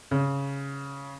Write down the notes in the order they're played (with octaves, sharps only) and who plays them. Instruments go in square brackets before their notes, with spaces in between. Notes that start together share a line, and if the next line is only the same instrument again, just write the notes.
[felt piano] C#3